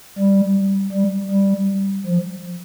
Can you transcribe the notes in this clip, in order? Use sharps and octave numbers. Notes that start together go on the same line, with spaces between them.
G3
G3
G3
F3